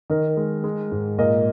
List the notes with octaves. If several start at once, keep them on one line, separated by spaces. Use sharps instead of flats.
D#3 A#4 D#5
G#3
G#3
G#2
A#2 A#4 D#5